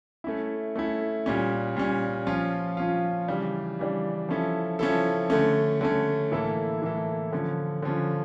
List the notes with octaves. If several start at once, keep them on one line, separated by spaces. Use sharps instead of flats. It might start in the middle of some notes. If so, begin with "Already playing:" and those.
A3 C#4 E4
A3 C#4 E4
A#2 G3 C#4
A#2 G3 C#4
F3 C#4 F4
F3 C#4 F4
C#3 E3 G3 D4
C#3 E3 G3 D4
F3 C#4 E4 A4
F3 C#4 E4 A4
D3 A3 C#4
D3 A3 C#4
A2 E3 A#3 E4 A4
A2 E3 A#3 E4 A4
D3 F3 C#4
D3 F3 C#4